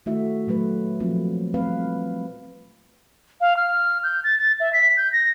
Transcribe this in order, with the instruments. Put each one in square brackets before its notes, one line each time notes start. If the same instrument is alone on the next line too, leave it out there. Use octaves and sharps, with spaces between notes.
[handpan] D#3 A3 E4 F#4 E5
A#2 F#3 A3 B4
F3 F#3 A#3 C4 F4
G3 A3 C4 B4 F5
[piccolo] F5
F6
G6
A6
A6
E5
B6
G6
A#6